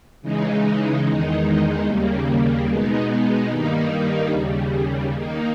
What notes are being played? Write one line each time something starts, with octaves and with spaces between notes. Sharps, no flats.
C#3 E3 G#3 D#4
E2 D#3 G#3 D#4
D#2 C#3 G3 A#3
B2 G#3 B3 D#4
G2 D#3 G3 A#3 D#4
D#2 C#3 G3
D#3 A#3 D#4